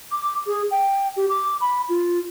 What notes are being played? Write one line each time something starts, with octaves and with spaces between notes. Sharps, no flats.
D6
G#4
G5
G4
D6
B5
F4